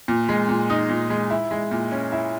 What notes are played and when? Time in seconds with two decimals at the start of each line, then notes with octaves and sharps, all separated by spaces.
0.08 A#2
0.29 G#3
0.49 A#2
0.70 D#4
0.89 A#2
1.10 G#3
1.30 E4
1.51 G#3
1.71 A#2
1.92 C#4
2.12 E4